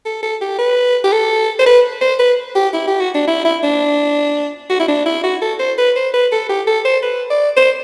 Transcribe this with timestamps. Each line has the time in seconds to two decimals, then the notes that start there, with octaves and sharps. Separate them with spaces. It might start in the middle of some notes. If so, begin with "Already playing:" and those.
0.05 A4
0.23 A4
0.41 G4
0.59 B4
1.04 G4
1.12 A4
1.59 C5
1.66 B4
2.01 C5
2.19 B4
2.55 G4
2.74 E4
2.88 G4
3.00 F#4
3.14 D4
3.28 E4
3.45 E4
3.63 D4
4.70 F#4
4.80 E4
4.88 D4
5.06 E4
5.24 F#4
5.41 A4
5.59 C5
5.78 B4
5.96 C5
6.14 B4
6.32 A4
6.49 G4
6.67 A4
6.85 C5
7.03 B4
7.30 D5
7.57 C5